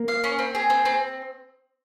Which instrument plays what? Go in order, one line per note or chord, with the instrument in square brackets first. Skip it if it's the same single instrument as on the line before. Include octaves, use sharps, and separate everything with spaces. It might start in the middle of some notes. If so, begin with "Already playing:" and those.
Already playing: [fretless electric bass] A#3
[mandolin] F5
C#4
C4
G#4
C4
C4